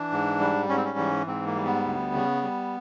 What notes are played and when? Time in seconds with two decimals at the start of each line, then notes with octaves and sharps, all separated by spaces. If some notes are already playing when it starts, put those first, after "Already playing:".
Already playing: E3 D4
0.12 G#2
0.40 G3
0.69 G#2 C#4
0.77 C4
0.84 C#4
0.98 E3
1.27 G#2 C4
1.46 A#3
1.56 G3
1.65 B3
1.85 D2
2.13 C#3
2.42 G3